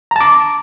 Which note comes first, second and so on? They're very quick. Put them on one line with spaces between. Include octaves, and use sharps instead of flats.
A#5 A5 D6